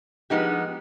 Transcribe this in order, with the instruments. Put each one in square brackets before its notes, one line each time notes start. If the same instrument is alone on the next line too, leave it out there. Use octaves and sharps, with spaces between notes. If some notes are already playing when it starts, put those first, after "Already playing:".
[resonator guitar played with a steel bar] F3 G#3 B3 D#4 G4